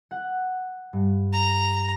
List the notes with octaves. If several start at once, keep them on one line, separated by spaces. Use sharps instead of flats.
F#5
G2
A#5